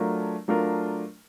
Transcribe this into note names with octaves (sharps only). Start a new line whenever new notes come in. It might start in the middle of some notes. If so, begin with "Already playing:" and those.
Already playing: F#3 A3 D4 F4 A#4
F#3 A3 D4 F4 A#4